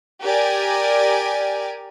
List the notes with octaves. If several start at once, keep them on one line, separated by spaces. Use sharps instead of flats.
G4 A#4 D5 G#5